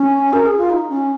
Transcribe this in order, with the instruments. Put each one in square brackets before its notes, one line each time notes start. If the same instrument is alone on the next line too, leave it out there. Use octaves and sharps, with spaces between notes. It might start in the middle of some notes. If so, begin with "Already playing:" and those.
Already playing: [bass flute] C#4
A#4
G#4
F4
D#4
C#4